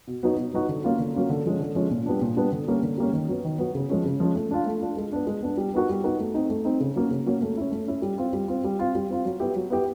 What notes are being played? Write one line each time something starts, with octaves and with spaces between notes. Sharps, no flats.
B2
F#3 B3 D#4 F#4
B2
F#3 B3 D#4 F#4
D3
F#3 A#3 C#4 F4
D3
F#3 A#3 C#4 F4
D3
F3 G#3 C#4
D3
F3 G#3 C#4
A#2
G3 B3 D4
A#2
G3 B3 D4
D3
G3 A#3 C#4
D3
G3 A#3 C#4
D#3
F#3 B3
D#3
F#3 B3
C#3
F3 G#3 C#4
C#3
F3 G#3 C#4
A3
D4 F4
A3
D4 F4
G#3
B3 D4
G#3
B3 D4
G3
B3 D#4 F#4 A#4
G3
B3 D#4 F#4 A#4
A3
C4 D#4
A3
C4 D#4
C#3
F#3 A#3 C#4
C#3
F#3 A#3 C#4
A3
C#4 E4
A3
C#4 E4
G3
C4 F4
G3
C4 F4
G3
C4 F4
G3
C4 F4
F#3
B3 E4 G4
F#3
B3 E4 G4